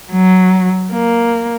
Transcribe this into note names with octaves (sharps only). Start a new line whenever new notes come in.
F#3
A#3